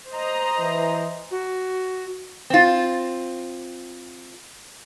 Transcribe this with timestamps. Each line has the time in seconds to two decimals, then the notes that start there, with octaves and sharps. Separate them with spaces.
0.12 C5 D#5 A#5
0.59 E3
1.31 F#4
2.50 C4 F4